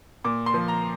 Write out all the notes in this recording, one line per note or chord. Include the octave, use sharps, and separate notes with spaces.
A#2 D6
C6
F3
A#5